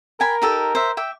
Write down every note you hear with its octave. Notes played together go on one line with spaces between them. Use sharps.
A#4 G5 G#5 B5
D#4 G4 A4
C5 E5
E5 G5 D6